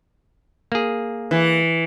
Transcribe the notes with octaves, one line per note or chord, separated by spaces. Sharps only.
A#3 G#4
E3